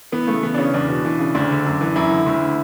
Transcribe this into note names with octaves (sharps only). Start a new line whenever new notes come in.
E3 B3
C#3 A3
E3 B3
D4
C#3 C#4
E2 D4
B2
E3
C#3
D2 D4
D3
F#2
E3
F#2 E4
D3
D2
D3